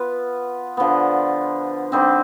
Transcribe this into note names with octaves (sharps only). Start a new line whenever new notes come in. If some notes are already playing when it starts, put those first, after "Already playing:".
Already playing: B3 F4 B4
D3 F3 B3
D3 G3 C4 D#4